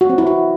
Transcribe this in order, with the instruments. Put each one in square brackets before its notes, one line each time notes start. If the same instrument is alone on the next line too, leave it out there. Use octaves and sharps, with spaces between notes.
[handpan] F#4
C4
E4
F#4